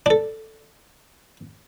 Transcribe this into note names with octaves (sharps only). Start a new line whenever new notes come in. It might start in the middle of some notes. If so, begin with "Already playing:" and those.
D4 A4